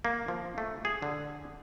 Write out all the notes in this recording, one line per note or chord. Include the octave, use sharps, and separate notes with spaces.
A#3
F3
A3
G#4
D3